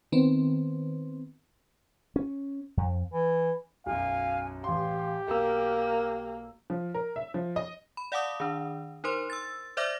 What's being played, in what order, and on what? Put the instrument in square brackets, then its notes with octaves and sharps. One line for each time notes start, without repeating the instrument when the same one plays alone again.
[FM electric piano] D#3 B3 C4
[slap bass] C#4
F2
[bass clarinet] E3
[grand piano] B1 F#2 [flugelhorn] F5 [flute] G#5
[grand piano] A1 C6 [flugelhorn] G4 [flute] F5
[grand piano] B1 E6 [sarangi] A#3 [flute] A#4
[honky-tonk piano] F3
A#4
E5
F3
D#5
[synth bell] B5
D5 F5 F#5 A5 D6 D#6
D#3 D4
D#4 A#4 C5 C6
E6 A6
C5 D5 E5 D6 F6 A#6